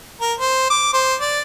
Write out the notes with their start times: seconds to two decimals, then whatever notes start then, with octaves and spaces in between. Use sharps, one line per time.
0.21 A#4
0.40 C5
0.70 D6
0.93 C5
1.21 D5